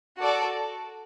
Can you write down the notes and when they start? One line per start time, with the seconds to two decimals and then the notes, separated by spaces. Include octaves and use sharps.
0.19 F#4 A4 D5